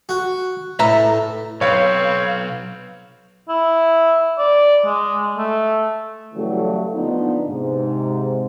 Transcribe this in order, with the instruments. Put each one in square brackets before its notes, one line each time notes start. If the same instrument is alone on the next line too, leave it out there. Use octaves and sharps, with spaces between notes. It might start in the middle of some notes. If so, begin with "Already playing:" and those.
[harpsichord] F#4
[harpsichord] A2 [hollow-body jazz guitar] B4 E5 A#5
[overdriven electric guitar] B1 [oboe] C4 [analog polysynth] B4 F5 [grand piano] C#5
[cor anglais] E4
D5
G#3
A3
[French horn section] C#3 E3 F#3 G3 A3
D3 F3 A#3 B3 D4 D#4
G#2 C3